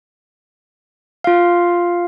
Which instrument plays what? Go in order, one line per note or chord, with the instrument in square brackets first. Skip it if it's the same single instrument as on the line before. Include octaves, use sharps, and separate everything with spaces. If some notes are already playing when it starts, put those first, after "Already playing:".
[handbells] F4 F5